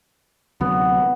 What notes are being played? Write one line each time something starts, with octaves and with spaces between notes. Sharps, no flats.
D2 C3 F#3 B3